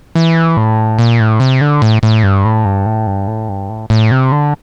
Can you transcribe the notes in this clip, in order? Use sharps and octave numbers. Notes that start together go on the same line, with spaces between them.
E3
A2
A#2
A2
C3
D3
A2
A2
G2
A2
G2
A2
G2
A2
G2
A2
A2
C3
D3